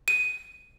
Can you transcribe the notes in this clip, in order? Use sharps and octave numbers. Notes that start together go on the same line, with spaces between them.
D#7